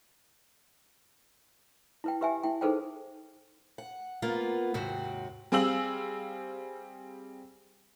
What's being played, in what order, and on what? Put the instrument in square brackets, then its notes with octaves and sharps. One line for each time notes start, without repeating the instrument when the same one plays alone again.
[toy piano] E4 B4 G5
G4 B4 E5 G5 G#5
E4 G5
D#4 G#4 A4 B4 C5 G5
[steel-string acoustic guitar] F#5
A#3 B3 F4
D#2 G#2 C3 F#4
[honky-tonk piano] G3 C4 G#4 F5 E6 F#7